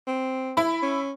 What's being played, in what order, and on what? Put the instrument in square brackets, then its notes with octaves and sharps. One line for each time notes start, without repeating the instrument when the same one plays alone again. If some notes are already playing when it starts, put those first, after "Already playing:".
[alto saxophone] C4
[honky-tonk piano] E4 B5
[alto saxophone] C#4